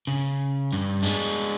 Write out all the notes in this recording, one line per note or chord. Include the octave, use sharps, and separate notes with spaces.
C#3
G2
G#3 D4